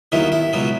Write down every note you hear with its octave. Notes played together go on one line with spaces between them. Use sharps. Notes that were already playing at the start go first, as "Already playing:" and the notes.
D#2 D#3 F#3 B3 E4
E4
C#2 B2 F#3 B3